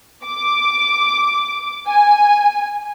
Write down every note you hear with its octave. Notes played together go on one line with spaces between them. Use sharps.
D6
G#5